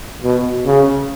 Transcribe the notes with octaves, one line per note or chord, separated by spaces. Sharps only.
B2
C#3